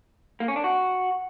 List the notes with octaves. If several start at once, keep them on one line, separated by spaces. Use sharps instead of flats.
A#3
C#4
D4
F#4